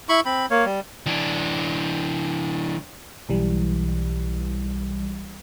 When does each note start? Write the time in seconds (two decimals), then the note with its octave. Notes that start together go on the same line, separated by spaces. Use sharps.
0.09 E4 B5 C#6
0.25 C4 B5
0.50 A#3 C#5
0.65 G3
1.06 E3 D4
3.29 B1 E3 G3